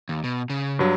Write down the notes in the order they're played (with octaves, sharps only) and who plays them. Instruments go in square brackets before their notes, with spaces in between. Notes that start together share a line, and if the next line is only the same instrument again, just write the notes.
[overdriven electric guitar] D#2
B2
C#3
[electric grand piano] G2 F#3